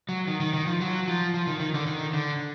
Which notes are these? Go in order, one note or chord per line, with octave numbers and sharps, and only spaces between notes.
F#3
D#3
D#3
D#3
F3
F#3
F3
F3
D#3
D#3
D3
D#3
D3